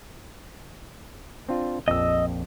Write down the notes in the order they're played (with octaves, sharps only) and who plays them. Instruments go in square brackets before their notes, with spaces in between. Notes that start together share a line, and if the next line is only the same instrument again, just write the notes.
[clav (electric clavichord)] C4 D4 F4
[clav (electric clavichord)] A#1 F2 [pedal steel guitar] D#5 E6